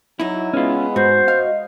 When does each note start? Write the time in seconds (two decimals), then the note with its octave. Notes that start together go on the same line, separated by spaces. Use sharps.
0.20 F#3 D#4 E4
0.53 G#3 B3 C#4 F4
0.96 G#2 F#4 C5
1.28 D#5 F5